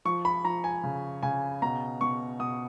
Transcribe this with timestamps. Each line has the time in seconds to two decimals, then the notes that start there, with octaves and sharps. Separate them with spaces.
0.05 F3 C#6
0.25 B5
0.45 F3 A#5
0.64 G#5
0.83 C#3
1.23 C#3 G#5
1.62 B2 A#5
2.01 B2 C#6
2.40 B2 D#6